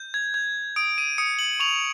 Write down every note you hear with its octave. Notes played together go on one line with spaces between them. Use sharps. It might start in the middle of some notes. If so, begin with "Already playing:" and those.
Already playing: G6
G#6
G6 G#6
D#6 D7
D#7
D#6 C#7
F#7
C#6 F7